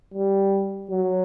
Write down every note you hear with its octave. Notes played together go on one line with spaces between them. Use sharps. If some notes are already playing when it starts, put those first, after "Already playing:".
G3
F#3